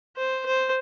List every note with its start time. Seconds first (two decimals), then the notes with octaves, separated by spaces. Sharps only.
0.16 C5
0.46 C5